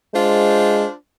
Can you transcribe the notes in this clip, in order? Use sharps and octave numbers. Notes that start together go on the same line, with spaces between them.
G#3 D4 F4 C5